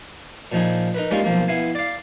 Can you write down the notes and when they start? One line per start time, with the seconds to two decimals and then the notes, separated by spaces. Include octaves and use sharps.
0.52 A#2 F3 D#4 G#4
0.95 D#4 A#4 B4
1.11 G3 G#3 A#3 C#4 D#4 F4
1.24 B1 F3 A#3
1.48 B3 E4 F5 G#5
1.75 D5 F5